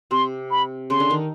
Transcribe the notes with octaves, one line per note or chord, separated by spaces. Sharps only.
C3 C4 C6
B5
C#3 C#4 C6
D3 D4
D#3 D#4